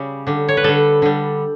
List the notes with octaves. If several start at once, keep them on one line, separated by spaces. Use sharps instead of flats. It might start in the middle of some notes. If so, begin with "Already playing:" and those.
Already playing: C#3 G3
D3 G3
C#5
B4
D3 G3 A4
D3 G3